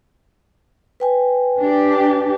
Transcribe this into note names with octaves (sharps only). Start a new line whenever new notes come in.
B4 G5 G#5
D4 G4